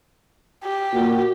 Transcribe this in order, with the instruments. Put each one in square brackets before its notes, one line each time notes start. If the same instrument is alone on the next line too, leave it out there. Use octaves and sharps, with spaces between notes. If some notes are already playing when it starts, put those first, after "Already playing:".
[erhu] G4
[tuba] A#2 [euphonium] F#4